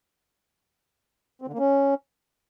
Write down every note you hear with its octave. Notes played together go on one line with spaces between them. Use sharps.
C4
D3
A#3
C#4